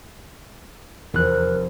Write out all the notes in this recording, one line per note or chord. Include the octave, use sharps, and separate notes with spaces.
F1 E2 A#4 F#6